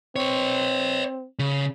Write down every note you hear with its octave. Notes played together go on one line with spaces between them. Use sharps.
C4 B4 C#5
C#3